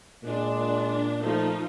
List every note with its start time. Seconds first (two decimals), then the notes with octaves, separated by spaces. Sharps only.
0.25 A#2 G#3 D4
1.22 F3 A3 D#4